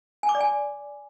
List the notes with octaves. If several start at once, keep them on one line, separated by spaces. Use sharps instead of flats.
G#5
D6
D5
G#5